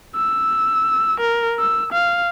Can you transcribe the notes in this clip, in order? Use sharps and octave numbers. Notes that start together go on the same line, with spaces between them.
E6
A#4
E6
F5